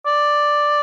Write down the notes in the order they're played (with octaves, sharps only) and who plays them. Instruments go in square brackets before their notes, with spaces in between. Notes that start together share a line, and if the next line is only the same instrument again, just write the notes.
[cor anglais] D5